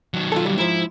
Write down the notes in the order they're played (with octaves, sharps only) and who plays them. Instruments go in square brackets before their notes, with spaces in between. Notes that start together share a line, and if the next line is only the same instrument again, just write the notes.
[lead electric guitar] D#3 F#3
[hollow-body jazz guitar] F4 A4
G3
[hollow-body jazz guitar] G#2 F3 [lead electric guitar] E4